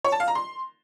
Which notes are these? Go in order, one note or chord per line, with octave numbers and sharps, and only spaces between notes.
C#5
A5
F5
A#5
C6